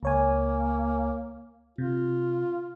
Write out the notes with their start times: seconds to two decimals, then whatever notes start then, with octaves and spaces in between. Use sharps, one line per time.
0.03 C#2 A#3 C#5 G#5
1.78 C3 F4